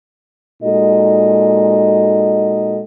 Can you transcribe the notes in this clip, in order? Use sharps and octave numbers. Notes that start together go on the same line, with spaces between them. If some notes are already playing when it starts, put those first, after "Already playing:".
A#2 G#3 D#4 F#4 A4 D#5